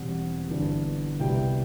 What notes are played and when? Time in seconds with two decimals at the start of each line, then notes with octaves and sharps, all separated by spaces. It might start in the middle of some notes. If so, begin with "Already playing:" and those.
Already playing: E1 E2 B2 G3 C4 F#5
0.48 G1 G2 E3 B3 D4
1.19 C2 B2 G3 B3 E4 G5